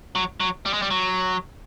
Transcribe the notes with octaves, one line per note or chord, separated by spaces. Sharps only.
F#3
F#3
G3
G#3
G3
F#3